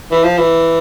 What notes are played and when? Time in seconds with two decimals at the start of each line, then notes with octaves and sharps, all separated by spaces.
0.11 E3
0.23 F3
0.38 E3